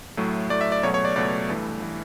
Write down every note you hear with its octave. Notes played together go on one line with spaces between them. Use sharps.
A2 F#3 A3
A2 F#3 A3 D5
E5
D5
C#2 B2 F#3 A3 C#5
C#5
D5
C#2 B2 F#3 A3 D5
G2 E3 A3
E3 A3